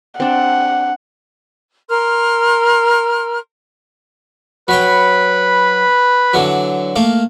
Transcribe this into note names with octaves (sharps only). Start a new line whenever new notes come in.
C4 D4 F#5
A#4 C6 F6
F#3 B4 C#5 G5 B5
D3 E3 F#3
A3 A#3 F5